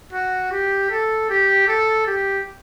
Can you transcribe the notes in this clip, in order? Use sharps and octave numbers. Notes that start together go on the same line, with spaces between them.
F#4
G4
A4
G4
A4
G4